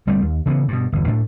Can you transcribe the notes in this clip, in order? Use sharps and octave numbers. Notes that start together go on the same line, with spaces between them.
G1 G3 A3 C4
D#2
C#3 E3 G#3 B3
G2 B2
G1 E2
A2 A3 D4